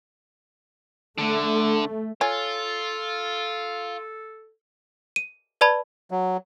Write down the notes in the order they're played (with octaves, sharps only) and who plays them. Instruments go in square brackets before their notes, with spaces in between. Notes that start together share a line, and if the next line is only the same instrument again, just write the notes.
[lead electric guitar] D3 [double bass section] A3
[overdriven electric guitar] F4 [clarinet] A4 [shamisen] C#5 G#5
[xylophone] D#7
B4 D5 A5 B5 G#6
[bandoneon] F#3